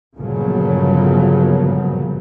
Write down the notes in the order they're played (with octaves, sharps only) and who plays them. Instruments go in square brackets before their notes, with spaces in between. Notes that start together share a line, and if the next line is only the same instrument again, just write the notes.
[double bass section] G1 A#2 C#3 F3 F#3